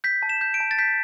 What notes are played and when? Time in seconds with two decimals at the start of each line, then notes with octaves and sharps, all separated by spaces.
0.04 G6 B6
0.23 A5
0.29 E7
0.41 G6
0.54 D7
0.60 A5
0.71 A6
0.79 G6 B6